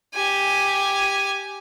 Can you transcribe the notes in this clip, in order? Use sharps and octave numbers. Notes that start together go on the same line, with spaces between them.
G4 G#5